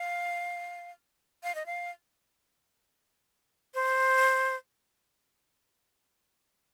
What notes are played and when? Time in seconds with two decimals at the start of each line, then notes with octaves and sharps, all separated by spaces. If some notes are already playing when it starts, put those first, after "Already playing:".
Already playing: F5
1.43 F5
1.55 D#5
1.66 F5
3.74 C5